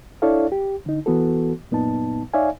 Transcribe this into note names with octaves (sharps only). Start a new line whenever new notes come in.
D4 E4 A4 C#5 D5 F5
G4
D3 D#4
E3 B3 F#4 A4
F#2 A#2 B3 D#4 A5
D#4 C#5 D5 E5 F5 G#5